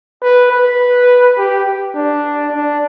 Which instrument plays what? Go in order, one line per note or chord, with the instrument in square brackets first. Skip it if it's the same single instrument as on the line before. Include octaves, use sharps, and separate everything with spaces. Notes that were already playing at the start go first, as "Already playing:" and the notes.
[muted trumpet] B4
B4
G4
D4
D4